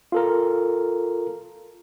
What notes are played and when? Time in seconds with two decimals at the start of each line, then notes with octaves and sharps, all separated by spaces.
0.12 F4 A4 A#4